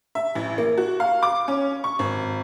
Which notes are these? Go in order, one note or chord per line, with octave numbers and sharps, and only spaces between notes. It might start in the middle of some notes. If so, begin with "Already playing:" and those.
E5
A1
A#3
F#4
F5
D6
C#4
C#6
G#1